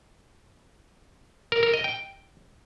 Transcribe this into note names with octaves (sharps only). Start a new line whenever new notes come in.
A#4
A#4
D#5
G5